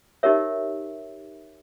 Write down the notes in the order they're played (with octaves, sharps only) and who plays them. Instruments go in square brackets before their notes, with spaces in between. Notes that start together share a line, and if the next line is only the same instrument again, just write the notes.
[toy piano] D#4 G4 A#4 C#5 E5